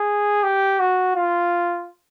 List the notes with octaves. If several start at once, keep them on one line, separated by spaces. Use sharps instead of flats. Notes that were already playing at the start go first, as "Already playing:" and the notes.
Already playing: G#4
G4
F#4
F4